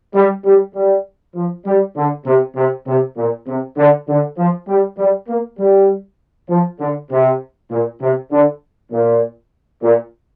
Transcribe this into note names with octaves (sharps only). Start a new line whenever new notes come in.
G3
G3
G3
F3
G3
D3
C3
C3
C3
A#2
C3
D3
D3
F3
G3
G3
A#3
G3
F3
D3
C3
A#2
C3
D3
A#2
A#2